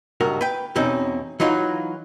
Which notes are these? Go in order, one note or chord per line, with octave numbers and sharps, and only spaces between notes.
C#2 G2 F#4 A#4
B4 G5
E2 B2 C4 C#4 D#4
E3 F#3 D#4 F4 F#4